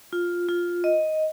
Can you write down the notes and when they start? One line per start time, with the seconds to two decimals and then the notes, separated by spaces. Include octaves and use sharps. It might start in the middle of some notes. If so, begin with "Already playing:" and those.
0.13 F4
0.49 F4
0.84 D#5